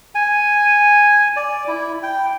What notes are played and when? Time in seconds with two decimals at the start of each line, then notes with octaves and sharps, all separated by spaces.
0.15 G#5
1.36 D5
1.68 E4
2.03 G5